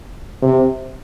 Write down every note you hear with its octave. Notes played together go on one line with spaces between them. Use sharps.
C3